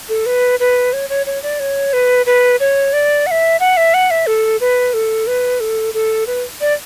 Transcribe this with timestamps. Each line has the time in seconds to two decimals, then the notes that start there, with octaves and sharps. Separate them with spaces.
0.09 A4
0.26 B4
0.60 B4
0.93 C#5
1.10 C#5
1.26 C#5
1.43 D5
1.60 C#5
1.93 B4
2.26 B4
2.60 C#5
2.93 D5
3.27 F#5
3.31 E5
3.60 F#5
3.77 E5
3.94 F#5
4.11 E5
4.27 A4
4.61 B4
4.94 A4
5.27 B4
5.60 A4
5.94 A4
6.27 B4
6.61 D5